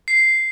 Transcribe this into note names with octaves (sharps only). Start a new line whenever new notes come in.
C7